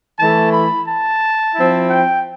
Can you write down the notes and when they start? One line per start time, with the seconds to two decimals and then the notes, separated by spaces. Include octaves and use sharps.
0.18 E3 A3 E4 A5
0.52 B5
0.86 A5
1.54 F3 C4 E4
1.88 G5